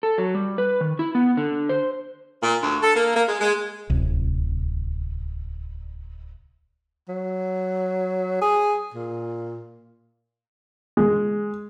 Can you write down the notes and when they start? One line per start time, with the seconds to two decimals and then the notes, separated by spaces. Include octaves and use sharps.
0.03 A4
0.18 F#3
0.35 G3
0.58 B4
0.81 D#3
0.99 E4
1.15 B3
1.37 D3
1.69 C5
2.42 A#2
2.62 D2
2.82 A4
2.95 A#3
3.15 A#3
3.27 G#3
3.41 G#3
3.90 D1 C2
7.09 F#3
8.41 G#4
8.94 A#2
10.97 G#3